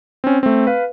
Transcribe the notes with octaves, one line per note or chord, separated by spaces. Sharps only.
C4 C#4
A3 C4
B4 F5